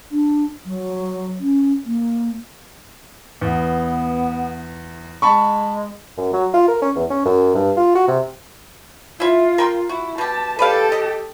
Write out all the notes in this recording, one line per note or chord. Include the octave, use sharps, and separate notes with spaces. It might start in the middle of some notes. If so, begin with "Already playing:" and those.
D4
F#3
C#4
A#3
E2 B3
G#3 A5 B5 C#6
F#2
F#3
F4
A#4
C#4
E2
C#4
F#2
G2
F4
F#4
C3
E4 F4 E5
A#4 G5 C6
E4 F#4
B2 G4 A5
G4 A4 B4 D5 F5
D#5